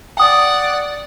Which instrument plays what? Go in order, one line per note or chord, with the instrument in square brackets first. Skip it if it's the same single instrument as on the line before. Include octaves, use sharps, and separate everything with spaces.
[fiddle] D5 F#5 [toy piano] G5 D#6